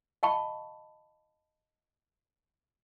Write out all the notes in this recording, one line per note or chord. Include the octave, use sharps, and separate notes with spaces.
D#5 F5 A5 B5 C#6